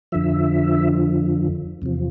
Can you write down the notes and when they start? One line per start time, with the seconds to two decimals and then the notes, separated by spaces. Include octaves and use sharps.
0.12 F2 D3 F3 E5
1.82 E2 C3 F3